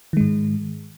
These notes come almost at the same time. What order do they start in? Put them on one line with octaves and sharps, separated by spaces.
D#3 G#3 G#2